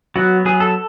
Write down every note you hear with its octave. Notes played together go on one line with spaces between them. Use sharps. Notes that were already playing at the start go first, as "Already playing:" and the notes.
F#3 B3 F#4
F#3 B3 G#4
A4